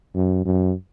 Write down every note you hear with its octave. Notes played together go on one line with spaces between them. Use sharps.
F#2
F#2